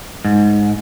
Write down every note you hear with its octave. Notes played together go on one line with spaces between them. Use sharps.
G#2